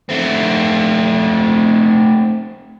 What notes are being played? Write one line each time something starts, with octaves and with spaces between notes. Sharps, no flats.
A3 C4